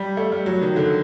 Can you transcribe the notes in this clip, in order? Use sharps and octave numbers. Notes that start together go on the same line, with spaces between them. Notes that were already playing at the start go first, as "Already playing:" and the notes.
Already playing: G3
A3
G3
F#3
D#3
D3